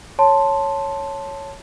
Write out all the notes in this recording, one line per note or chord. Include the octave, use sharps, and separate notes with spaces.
C#5 A5 C6